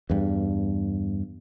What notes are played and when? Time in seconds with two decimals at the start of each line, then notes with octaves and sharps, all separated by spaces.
0.10 E2 G2